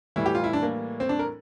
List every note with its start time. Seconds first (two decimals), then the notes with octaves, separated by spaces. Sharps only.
0.16 A2 E3 G3 E4
0.26 G4
0.35 F4
0.44 E4
0.53 D4
0.63 A#3
1.00 C4
1.09 D4
1.19 A#4